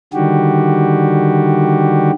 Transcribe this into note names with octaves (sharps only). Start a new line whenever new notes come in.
D3 D#3 G3 F#4 G4